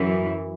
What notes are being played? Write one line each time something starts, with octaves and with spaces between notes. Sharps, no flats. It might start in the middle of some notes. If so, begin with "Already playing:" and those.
Already playing: F#2 E3